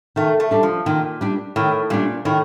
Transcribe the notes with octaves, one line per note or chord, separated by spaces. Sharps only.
D#3 A3
A3
G3 D4
F3
A#2 D#3
G3 D4
A2 D#3
A#2 G3 D4
A2 D#3